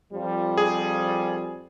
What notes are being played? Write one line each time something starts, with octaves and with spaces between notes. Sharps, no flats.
F2 F3 G3
G#4